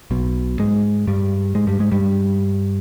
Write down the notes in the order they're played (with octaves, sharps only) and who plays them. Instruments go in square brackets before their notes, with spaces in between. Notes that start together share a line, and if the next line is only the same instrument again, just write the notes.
[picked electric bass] B1 B2
G#2 G#3
G2 G3
G#2 G#3
G2 G3
G#2 G#3
G2 G3